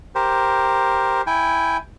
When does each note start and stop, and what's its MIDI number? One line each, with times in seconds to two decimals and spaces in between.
0.15 1.22 67
0.15 1.22 70
0.15 1.22 72
1.27 1.77 64
1.27 1.77 79
1.27 1.77 80